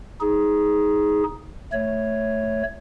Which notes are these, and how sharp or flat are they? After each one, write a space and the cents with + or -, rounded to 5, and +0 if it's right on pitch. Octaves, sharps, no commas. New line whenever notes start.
D#4 +15 G#4 +0
A3 +0 C#5 +0